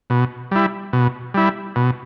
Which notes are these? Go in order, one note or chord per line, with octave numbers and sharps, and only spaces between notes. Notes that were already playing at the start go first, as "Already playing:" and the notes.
B2
G3 E4
B2
G3 E4
B2